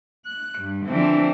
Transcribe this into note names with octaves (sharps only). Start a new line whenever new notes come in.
F#6
G2
D3 E3 F3 C4 D4